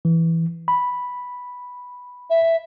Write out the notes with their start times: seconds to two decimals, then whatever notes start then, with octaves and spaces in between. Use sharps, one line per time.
0.05 E3
0.68 B5
2.30 E5